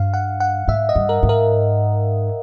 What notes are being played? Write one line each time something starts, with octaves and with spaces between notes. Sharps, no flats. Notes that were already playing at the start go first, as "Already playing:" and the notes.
Already playing: G2 F5
F#5
F#5
G#2 E5
D#5
G2
A#4
G#2
A#4